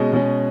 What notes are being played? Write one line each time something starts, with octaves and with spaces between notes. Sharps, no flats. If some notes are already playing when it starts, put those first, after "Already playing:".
Already playing: B2 G#3 C#4 D#5
B2 G#3 C#4